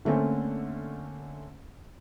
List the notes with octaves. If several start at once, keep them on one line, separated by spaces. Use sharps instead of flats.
D3 A3 A#3 C4 C#4